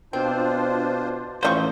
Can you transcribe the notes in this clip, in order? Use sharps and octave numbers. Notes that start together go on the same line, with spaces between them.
B2 C4 D4 F4 C5
A1 F4 C5 D#5 C#6